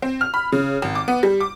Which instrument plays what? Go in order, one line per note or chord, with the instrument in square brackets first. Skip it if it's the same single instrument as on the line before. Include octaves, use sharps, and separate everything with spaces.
[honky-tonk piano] C4
F6
B5
C#3
G#1
D6
B3
G3
D6